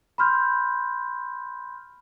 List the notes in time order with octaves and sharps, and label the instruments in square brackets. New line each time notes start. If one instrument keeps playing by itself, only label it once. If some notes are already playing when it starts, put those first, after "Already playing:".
[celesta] B5 C6 F6 G6